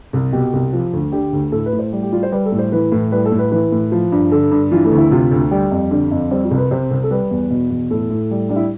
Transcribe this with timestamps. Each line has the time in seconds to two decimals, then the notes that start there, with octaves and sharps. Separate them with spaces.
0.13 C2
0.32 B2 G4
0.53 C2
0.73 F3
0.93 D2
1.12 D3 G4
1.32 D2
1.52 A2 A4
1.66 B4
1.73 A2
1.79 C5
1.92 G3
2.03 G4
2.12 G3 F4
2.23 C5
2.32 G3 B4
2.46 A4
2.52 A2
2.59 C5
2.72 E3 B4
2.92 A2
3.12 G3 B4
3.25 A4
3.32 A2
3.39 B4
3.51 E3 B4
3.72 A2
3.92 F3
4.12 G2
4.31 D3 A4
4.51 G2
4.71 E3 F4
4.85 A3
4.92 D2
4.98 E4
5.11 C3 F4
5.31 D2
5.51 G3 G4
5.71 F2
5.91 D3
6.11 F2
6.31 G3 C4
6.44 F4
6.51 C2
6.58 B4
6.71 C3 C5
6.91 C2
7.04 A4
7.11 G3 B4
7.31 E2
7.50 B2
7.70 E2
7.90 A2 A4
8.10 A2
8.31 G3
8.49 G3 D4
8.56 E4